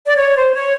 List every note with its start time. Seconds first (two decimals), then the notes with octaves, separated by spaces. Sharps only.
0.06 D5
0.17 C#5
0.36 C5
0.54 C#5